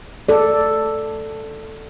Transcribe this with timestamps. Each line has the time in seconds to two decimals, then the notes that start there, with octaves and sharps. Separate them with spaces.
0.29 A4 D5